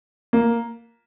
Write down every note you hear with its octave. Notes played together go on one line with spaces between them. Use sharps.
A#3